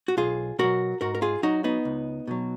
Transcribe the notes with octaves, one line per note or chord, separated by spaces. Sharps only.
F#4
B1 F4 G#4
B2 F#3 F#4 A#4
G#2 F#4 A#4
A#4
F4 G#4
F#3 D#4 F#4
B3 D#4
C#2
B2 F#3